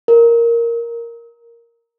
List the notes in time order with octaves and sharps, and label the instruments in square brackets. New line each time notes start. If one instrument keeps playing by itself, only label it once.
[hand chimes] A#4